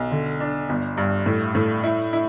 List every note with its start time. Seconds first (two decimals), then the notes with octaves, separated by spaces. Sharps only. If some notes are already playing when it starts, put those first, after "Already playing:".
Already playing: B1
0.11 D3
0.40 D4
0.69 G1
0.97 G2
1.26 A2
1.55 A2
1.83 E4
2.13 E4